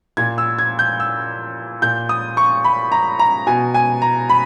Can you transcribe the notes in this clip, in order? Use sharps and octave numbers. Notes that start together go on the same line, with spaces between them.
A#2 G#6
E6
G#6
G6
E6
A#2 G6
D#6
C#6
B5
A#5
A#5
B2 G#5
G#5
A#5
B5